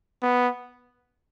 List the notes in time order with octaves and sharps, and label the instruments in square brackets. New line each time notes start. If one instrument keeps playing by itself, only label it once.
[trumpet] B3